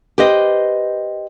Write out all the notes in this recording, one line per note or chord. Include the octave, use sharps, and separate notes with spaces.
G4 B4 C5 D#5